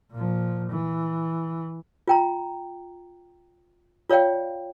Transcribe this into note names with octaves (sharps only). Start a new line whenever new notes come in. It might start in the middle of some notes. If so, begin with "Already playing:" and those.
A#2 F3
E3
F4 G5 A#5
F4 C#5 D5 F5 G5